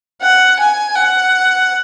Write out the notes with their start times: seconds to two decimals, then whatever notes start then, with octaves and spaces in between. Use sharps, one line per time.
0.21 F#5
0.59 G#5
0.96 F#5